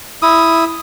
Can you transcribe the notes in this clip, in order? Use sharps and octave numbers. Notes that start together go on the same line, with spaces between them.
E4 D#6